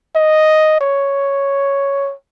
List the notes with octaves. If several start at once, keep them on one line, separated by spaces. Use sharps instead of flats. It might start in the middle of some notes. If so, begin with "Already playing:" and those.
D#5
C#5